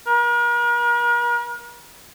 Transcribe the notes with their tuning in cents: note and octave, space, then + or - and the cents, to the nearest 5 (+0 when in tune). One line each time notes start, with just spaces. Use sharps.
A#4 +40